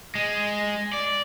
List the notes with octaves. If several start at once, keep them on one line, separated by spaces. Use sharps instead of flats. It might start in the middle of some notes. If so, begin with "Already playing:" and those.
G#3
D5